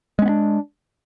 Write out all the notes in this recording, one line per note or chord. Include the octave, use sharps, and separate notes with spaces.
G#3 B3 C#4 D4